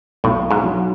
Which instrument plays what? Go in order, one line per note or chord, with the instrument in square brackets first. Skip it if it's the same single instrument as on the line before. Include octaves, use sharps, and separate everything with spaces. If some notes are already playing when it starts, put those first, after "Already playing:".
[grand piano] B1 [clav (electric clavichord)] A2
[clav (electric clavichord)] G#2
[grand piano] F#3